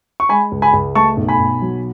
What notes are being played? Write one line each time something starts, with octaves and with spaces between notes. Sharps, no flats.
C#6
G#3 G#5 B5
C#2
G#5 B5
C#2
A3 A5 C#6
B1
G#5 B5
B1
F#3